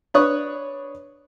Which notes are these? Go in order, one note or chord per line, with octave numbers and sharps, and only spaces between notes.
D4 B4 C#5 C#6 D#6 F#6